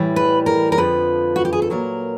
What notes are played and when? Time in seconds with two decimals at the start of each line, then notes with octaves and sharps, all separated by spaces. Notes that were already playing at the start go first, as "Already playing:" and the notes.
Already playing: A2 E3 G3
0.16 B4
0.46 A#4
0.72 A#4
0.78 F2 D3 F3 B4
1.36 F#4
1.45 G4
1.53 G#4
1.62 A4
1.70 A#2 F#3 A#4